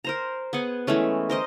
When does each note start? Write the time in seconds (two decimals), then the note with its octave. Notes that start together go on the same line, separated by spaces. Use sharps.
0.04 A#4 C5 A#5
0.53 B3 G#4 F#5
0.87 E3 G#3 A3 C#4
1.30 A#4 C5 D#5